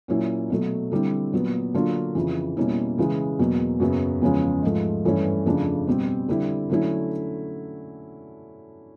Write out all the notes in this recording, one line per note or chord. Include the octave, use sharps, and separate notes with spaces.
A#2 F#3 A#3 C#4 E4
B2 F#3 A3
D3 G3 C4 E4
A#2 F#3 B3
D3 F#3 A#3 D4 F4
F2 C#3 E3
B2 G3 A#3 C#4 E4
C#3 E3 G#3
E2 B2 F#3 A#3
F#2 C#3 F#3 B3
E2 C#3 F3 G#3 C#4
G#2 F3 A3
G2 E3 A3 C#4
F2 C#3 F3 A3 D4
B2 G3 C4
D3 G3 C4 E4
D3 F#3 A3 C#4 E4